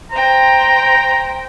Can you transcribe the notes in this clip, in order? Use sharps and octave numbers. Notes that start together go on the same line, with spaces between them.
C5 G5 A#5